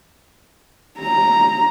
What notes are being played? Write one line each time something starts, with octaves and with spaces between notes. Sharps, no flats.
A#5